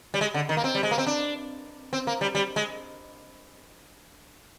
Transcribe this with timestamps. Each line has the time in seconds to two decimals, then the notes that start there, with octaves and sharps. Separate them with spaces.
0.14 G3
0.21 G#3
0.34 D3
0.49 D#3
0.57 A#3
0.64 C4
0.75 G3
0.83 G#3
0.91 A#3
0.98 C4
1.07 D4
1.93 C4
2.07 A#3
2.21 G3
2.35 G3
2.56 G#3